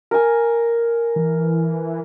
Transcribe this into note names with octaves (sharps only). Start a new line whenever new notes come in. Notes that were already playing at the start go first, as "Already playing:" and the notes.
A#4 G#5
E3